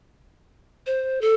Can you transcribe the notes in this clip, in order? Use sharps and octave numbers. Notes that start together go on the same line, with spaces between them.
C5
A4